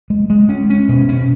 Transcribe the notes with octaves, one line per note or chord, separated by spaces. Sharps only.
G#3
G#3
C#4
C#4
B2
C#4